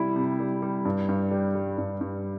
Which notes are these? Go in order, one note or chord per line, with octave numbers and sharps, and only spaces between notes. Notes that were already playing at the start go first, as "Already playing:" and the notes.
Already playing: C3 G3 E4
C3
G3
G3
G2
G2
G3
G3
G2
G2